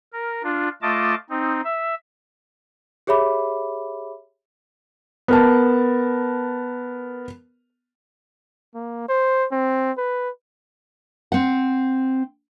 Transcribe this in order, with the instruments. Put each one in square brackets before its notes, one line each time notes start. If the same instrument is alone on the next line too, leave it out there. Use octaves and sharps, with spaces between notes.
[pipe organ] A#4
D4 F4
A3 F4 D#5 A5 D6
C4 D#4
E5
[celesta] G4 G#4 C#5 E5 B5 D6
[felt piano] B3 A#4 A5
[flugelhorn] A#3
C5
C4
B4
[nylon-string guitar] C4 F#5